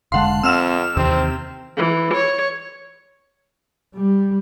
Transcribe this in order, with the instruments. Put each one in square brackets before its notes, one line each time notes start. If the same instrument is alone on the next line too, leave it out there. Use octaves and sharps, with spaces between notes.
[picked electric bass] F1 D3 G#3 [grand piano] F5 A5 [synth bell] F#5 C6
[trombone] F2 [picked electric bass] C4 [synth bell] E6 F6 E7
[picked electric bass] D#2 D#3 E3 [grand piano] C3 [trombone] C4
[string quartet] E3
C#5
[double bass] G3